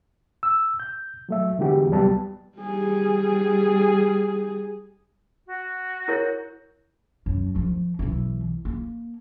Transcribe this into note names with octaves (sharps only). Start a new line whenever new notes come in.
E6
G6
F#3 A3 E5
D3 E3 G#3 B3 F#4 G4
C2 F#3 G3 B3 A5
G3 G#4
F#4
E4 A#4 C#5
F#2
D#3 F3
B1 E3
A#3